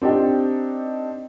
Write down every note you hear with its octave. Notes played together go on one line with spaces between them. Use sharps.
C4 D4 D#4 G4